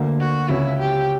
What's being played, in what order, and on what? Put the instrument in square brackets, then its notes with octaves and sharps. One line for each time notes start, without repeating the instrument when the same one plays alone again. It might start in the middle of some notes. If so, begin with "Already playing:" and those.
Already playing: [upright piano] D2 D3 A#3
[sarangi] F#4
[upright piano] C#2 C#3 F#3 C#4 [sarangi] E4
[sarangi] G4